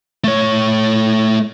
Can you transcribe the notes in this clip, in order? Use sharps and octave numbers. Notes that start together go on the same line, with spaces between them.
A3 C#5